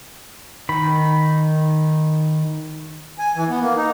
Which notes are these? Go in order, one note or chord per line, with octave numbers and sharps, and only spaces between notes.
D#3 B5
G#5
E3
B3
A#3
D#4